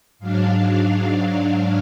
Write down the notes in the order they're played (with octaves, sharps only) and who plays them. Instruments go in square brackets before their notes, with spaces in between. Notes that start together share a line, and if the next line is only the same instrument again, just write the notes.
[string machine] G#2 F#3 D4 F5